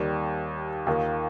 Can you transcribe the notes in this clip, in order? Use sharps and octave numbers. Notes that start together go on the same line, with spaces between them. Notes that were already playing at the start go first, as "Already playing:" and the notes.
Already playing: D#2 D#3 G3
D#2 D#3 A#3 F4